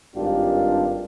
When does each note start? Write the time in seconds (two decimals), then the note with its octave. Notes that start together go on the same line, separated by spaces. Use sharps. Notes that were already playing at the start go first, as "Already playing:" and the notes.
0.15 G#1 G2 D4 F4 G4